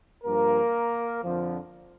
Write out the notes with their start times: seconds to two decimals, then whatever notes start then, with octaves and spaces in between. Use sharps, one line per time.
0.24 G2 F3 A#3 A#4
1.23 F2 D3 F3